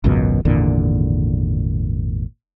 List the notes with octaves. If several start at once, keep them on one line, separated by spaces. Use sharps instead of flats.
G#1 C#2 F#2 B2
G#1 E2 A#2 D3